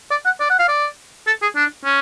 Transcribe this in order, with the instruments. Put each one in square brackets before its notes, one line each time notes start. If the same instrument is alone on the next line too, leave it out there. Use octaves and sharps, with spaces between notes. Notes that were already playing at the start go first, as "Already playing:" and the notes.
[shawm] D5
F#5
D5
F#5
F5
D5
A4
G#4
D4
C#4